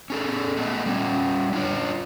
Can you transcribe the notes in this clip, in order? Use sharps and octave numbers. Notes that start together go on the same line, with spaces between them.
C#4 G#4 A4
A3 B3 D#5
G3 C#4
D4 F4 C#5